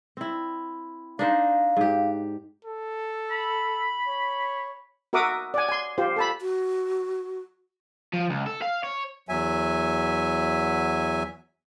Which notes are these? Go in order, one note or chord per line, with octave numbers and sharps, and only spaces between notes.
C4 E4
D4 D#4 C5 F5
G#2 G4
A4
B5
C#5
F#4 A#4 E5 F#5 D6 D#6
D5 F#5 G#5
G#5 C6
F4 G4 C5
A4 A5 B5
F#4
F3
C#2
A4
F5
C#5
E2 F#3 E5 G#5